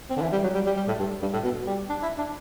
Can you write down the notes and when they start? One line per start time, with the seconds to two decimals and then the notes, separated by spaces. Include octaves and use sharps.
0.10 C4
0.17 D3
0.22 E3
0.32 G3
0.44 F#3
0.55 G3
0.66 G3
0.77 G3
0.88 A2
0.99 G2
1.22 G2
1.33 A2
1.44 B2
1.67 G3
1.89 D4
2.03 E4
2.18 D4